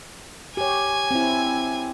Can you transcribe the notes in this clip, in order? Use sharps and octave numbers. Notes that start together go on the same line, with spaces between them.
G4 C#5 G#5
C4 E4